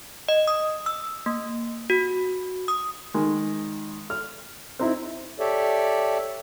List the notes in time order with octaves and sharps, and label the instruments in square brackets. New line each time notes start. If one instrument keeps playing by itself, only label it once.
[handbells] D#5
D#6
E6
A#3
F#4
D#6
[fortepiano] D#3 G#3
F6
C4 D#4 E4
[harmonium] G4 A4 C#5 D5 E5